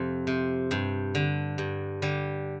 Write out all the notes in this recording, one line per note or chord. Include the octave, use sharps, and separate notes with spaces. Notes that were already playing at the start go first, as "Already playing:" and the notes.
Already playing: F2 C3
C3
G2
D3
G2
D3 G3